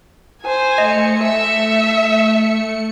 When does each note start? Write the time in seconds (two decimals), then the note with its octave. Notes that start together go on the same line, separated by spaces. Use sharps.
0.42 C5 G#5
0.78 A3 D#5 C#7
1.22 E5